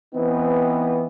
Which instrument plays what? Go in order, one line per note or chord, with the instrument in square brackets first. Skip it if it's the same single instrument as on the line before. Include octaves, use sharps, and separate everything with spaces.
[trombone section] E3 B3 C4 D#4